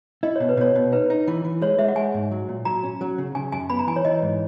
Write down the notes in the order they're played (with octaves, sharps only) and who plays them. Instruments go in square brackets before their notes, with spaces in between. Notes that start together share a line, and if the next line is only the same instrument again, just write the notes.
[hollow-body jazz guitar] E4 [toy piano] D#5
[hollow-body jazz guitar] B2 [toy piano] C#5
[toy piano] B4
[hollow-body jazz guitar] B2 [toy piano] C#5
[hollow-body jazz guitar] B2
[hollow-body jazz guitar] D#4 [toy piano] B4
[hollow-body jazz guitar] D#4
E3
E3
[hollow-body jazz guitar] G#3 [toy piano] C#5
[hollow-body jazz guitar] G#3 [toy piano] E5
[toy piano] F#5
[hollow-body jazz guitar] G#3 [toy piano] G#5
[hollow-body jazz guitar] G#2
F#3
A#2
[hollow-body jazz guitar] F#3 [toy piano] A#5
[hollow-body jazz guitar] C#4
F#3
C#3
[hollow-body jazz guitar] C#3 [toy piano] G#5
[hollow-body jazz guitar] F#2 [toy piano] G#5
[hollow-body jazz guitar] B3 [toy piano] B5
[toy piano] A#5
[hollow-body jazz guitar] E3 [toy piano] G#5
[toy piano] C#5
[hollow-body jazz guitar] E3 [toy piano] D#5
[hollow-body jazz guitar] G#2